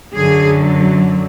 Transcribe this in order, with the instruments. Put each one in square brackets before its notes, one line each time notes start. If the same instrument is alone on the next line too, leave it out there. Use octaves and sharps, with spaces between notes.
[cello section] F#2 D3 F#3 G#4